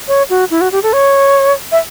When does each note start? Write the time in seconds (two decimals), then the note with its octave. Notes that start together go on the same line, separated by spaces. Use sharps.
0.08 C#5
0.30 F#4
0.50 E4
0.61 F#4
0.72 G4
0.83 A4
0.93 C#5
1.72 E5